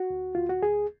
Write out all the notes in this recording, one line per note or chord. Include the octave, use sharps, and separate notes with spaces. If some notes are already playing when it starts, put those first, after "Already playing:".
Already playing: F#4
D2
D2 F4
F#4
D2 G#4